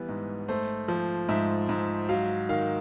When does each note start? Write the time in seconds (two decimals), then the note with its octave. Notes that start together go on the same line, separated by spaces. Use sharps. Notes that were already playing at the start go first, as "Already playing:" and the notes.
Already playing: E3 G3 B3
0.09 G#2
0.48 A3 C5
0.88 F3
1.29 G#2 E5
1.69 G#2
2.09 F#3 F5
2.49 D#3 F5